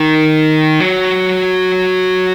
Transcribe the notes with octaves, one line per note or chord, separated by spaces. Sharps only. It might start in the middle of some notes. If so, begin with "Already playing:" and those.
Already playing: D#3
F#3